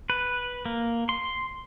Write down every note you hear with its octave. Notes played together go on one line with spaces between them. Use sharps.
B4
A#3
C6